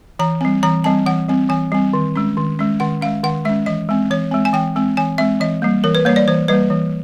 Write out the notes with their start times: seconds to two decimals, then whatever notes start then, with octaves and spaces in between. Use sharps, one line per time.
0.19 E3 A#5
0.41 G3 C4
0.63 E3 A#5
0.84 G3 C4 A5
1.06 E3 F#5
1.28 G3 C4
1.49 E3 G#5
1.72 G3 C4
1.93 D#3
2.16 G#3 C#4
2.37 D#3
2.59 G#3 C#4
2.80 D#3 F#5
3.01 C#4 F5
3.06 G#3
3.23 D#3 F#5
3.45 G#3 E5
3.50 C#4
3.66 E3 D#5
3.89 G#3 C4
4.11 E3 C#5
4.31 G#3 C4
4.45 G#5
4.53 E3 G5
4.76 G#3 C4
4.97 E3 G#5
5.18 G#3 C4 E5
5.40 E3 D#5
5.62 G3 A#3
5.84 E3 A#4
5.95 B4
6.05 A#3 C#5
6.09 G3
6.16 D5
6.28 E3 C5
6.48 G3 A#3 B4
6.70 E3